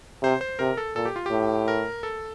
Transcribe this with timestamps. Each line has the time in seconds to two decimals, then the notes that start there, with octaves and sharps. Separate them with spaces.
0.23 C3 C5
0.41 C5
0.59 C3 A#4
0.77 A4
0.96 A#2 A4
1.05 G4
1.16 F4
1.26 G4
1.31 A2
1.68 A#4
2.03 A4